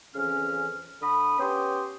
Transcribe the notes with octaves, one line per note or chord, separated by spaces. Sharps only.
F2 C#3 E3 C#4 F6
D3 B5 D#6
B3 C#4 G4 G5 C6 D#6